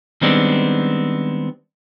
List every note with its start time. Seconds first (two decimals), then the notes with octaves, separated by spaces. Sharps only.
0.21 D#3 G3 G#3 B3 C4 D4